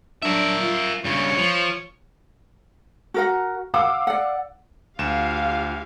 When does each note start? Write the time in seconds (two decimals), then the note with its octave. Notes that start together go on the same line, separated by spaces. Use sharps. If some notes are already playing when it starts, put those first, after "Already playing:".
0.22 F#3 D4 A#4 E5
0.59 F4
1.04 G2 C#3 C#5
1.37 F3
3.14 F#4 A#4 F#5
3.74 F5 F#5 D6 E6
4.07 D5 F#5
4.99 D2 F4 G4 F5 E7